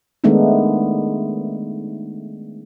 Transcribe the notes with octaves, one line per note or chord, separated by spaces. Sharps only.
D#3 G#3 A3 B3 D4 D#4